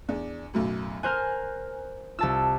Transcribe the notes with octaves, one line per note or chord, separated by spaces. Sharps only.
E2 D4
B1 F#2 A2
A#4 C5 G#5 F6 F#6
C2 F4 A5 E6